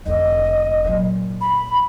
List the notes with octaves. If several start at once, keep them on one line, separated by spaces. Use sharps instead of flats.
F1 D3 D#5
A#2 F#3
B5